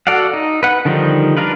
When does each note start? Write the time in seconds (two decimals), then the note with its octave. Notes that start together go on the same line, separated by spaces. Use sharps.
0.07 F#4 A4 D5 F5 F#5
0.34 D#4
0.63 B4 F#5
0.85 D3 D#3 F3 G3 D#4
1.37 D4 F4 A#4 B4